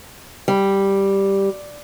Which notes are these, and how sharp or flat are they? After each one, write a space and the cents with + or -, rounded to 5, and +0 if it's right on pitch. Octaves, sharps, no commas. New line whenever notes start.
G3 +0